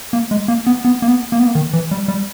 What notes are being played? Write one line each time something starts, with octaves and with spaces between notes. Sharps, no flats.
A#3
G#3
A#3
B3
B3
A#3
B3
A#3
B3
A#3
D#3
E3
G3
G3